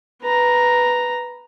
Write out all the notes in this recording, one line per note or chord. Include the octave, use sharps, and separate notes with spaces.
B4 A#5